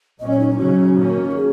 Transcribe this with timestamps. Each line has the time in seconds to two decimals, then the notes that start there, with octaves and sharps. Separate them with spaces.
0.20 A#2 F#3 C#4 D#5
0.30 C#5
0.40 D#4
0.50 D#4
0.58 C#3 F#3 C#4 F#4
0.97 D#3 A#3 C#4
1.29 F#4
1.36 G#4